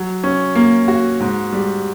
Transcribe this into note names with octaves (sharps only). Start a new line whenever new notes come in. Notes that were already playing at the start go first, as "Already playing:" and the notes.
Already playing: F#3
C#4
A#3
F#4
G#2
G3